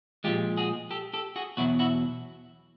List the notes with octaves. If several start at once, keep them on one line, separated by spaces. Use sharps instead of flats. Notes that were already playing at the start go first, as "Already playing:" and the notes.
A#2 F3 G#3 F4 G4
F#4 G#4
G4 A4
G4 A4
F#4 G#4
E2 B2 F#3 E4 F#4
E4 F#4